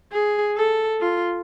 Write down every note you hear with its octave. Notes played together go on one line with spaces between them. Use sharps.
G#4
A4
F4